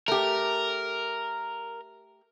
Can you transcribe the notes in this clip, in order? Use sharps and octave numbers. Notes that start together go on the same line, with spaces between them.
A3 G4 A#4